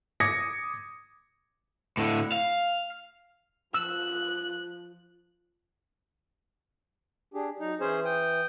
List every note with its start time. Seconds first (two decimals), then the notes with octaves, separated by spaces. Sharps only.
0.20 D6 D#6 G#6 A#6 C#7
1.97 A2 D3
2.32 F5
3.74 F3 E6 F#6
7.34 D4 G4 G#4
7.60 F#3 D#4
7.80 E3 C#4 G#4 C5
8.05 G5 D#6